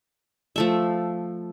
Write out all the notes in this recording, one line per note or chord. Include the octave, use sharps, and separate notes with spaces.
F3 A3 E5